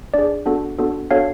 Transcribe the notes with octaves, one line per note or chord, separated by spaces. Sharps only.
D4 G#4 D5
B3 D4 F#4 A4
B3 D4 F#4 A4
B3 D4 F#4 A4 C#5 F5